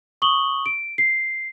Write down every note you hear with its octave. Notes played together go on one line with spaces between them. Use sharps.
C#6 D#6 F#7 G7
D7
C7